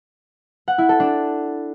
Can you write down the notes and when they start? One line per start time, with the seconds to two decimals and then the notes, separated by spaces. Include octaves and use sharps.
0.68 F#5
0.78 E4
0.89 A4
1.00 D4